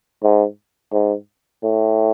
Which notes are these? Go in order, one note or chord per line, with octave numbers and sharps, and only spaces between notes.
G#2
G#2
A2